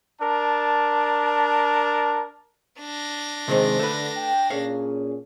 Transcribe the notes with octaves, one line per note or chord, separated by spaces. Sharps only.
D4 A#4 A5
D4 A#6
C3 D#3 G#3 C4
D3 A3 B4
G5
A#2 C#4 G#4 C#5 F5